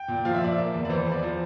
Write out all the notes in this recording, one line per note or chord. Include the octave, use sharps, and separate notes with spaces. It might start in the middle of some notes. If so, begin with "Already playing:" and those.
Already playing: G5
A#2
F3 F5
E5
A#2 D5
E5
A#3
E2
D5
E3 C5
E2
D5
F3 C5